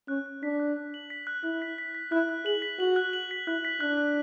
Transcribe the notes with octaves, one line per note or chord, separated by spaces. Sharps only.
C#4 F#6
F#6
D4 B6
F#6
F#6
F#7
B6
F#6
E4 F#6
B6
B6
B6
E4 F#6
F#6
G#4 F#7
B6
F#4 F#7
F#6
F#7
B6
E4 F#6
B6
D4 F#6
F#6